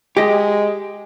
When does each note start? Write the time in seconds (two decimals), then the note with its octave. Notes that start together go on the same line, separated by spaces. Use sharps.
0.17 G#3 G4 D#5